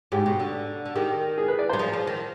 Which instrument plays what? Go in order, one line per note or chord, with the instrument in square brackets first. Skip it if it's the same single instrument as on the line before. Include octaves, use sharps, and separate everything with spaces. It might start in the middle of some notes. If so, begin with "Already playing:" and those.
[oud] G#2 [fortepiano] G4
[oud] B2
D3
D3
[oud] D#3 [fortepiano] G4
[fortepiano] G#4
B4
D5
C5
[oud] G3
[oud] F3 [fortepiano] G#4
[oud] F3
D#3